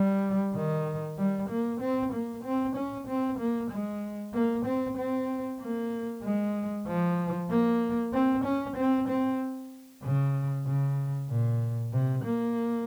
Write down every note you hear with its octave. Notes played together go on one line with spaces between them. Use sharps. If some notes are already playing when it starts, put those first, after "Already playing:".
Already playing: G3
D#3
G3
A#3
C4
A#3
C4
C#4
C4
A#3
G#3
A#3
C4
C4
A#3
G#3
F3
A#3
C4
C#4
C4
C4
C#3
C#3
A#2
C3
A#3